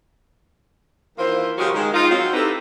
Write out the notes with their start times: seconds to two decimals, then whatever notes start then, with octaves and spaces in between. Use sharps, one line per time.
1.18 D#3 E3 A#3 F4 C5
1.58 C#3 F#3 G#3 F4 G4 A#4
1.75 D#3 G#3
1.94 D#4 F4
2.10 F#3 C4
2.34 C4 D#4 E4 G4 A4 B4